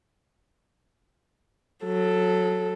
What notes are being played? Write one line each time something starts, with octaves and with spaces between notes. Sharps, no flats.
F#3 A4